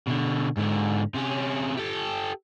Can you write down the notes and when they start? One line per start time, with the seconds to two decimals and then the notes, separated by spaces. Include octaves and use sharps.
0.07 B2 D3
0.57 G#2 D3
1.15 C3 C#4
1.77 G4 A4